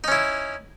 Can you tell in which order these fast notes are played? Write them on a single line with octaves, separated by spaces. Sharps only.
D#4 C#4 E4